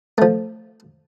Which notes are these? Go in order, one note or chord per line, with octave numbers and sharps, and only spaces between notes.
F3 A3